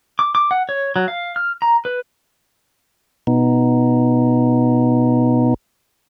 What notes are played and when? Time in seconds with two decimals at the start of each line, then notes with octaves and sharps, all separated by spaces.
0.19 D6
0.35 D6
0.51 F#5
0.69 C#5
0.96 F#3
1.08 F5
1.36 F6
1.62 A#5
1.85 B4
3.27 B2 B3 D#4